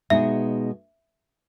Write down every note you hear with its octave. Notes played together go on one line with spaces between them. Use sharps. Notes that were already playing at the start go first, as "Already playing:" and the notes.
B2 G#3 B3 D#4 G#4 E5